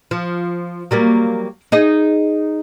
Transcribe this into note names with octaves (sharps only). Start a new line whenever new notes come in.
F3
F#3 G3 A#3
D#4 G#4 D#5